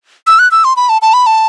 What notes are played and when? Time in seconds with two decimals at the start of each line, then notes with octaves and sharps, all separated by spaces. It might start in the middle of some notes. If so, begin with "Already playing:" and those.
0.27 E6
0.39 F#6
0.51 E6
0.64 C6
0.77 B5
0.89 A5
1.02 A5
1.14 B5
1.26 A5